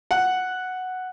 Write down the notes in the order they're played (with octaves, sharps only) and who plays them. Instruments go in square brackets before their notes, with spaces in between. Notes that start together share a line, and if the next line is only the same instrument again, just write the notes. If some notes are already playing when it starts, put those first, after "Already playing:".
[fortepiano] F#5